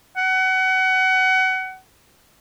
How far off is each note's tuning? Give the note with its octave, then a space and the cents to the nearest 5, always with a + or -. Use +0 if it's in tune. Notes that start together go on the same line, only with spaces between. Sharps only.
F#5 +25